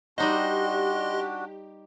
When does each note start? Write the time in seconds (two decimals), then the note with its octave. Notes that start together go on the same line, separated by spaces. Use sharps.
0.18 G3 D4 D#4 F#4 G4 C5 D#5 C6